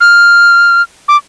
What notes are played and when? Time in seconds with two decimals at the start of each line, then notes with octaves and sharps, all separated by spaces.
0.01 F6
1.08 D6